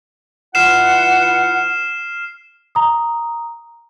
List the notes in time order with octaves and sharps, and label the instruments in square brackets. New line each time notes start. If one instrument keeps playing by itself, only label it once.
[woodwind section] E3 F4 F#5 [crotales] F6 C7 E7
[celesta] A#5 D#6